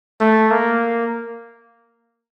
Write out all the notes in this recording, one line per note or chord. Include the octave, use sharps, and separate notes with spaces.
A3
A#3